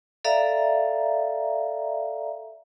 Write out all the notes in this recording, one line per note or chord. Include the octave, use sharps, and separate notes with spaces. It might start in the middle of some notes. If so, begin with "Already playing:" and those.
A4 D5 E5 F5 A#5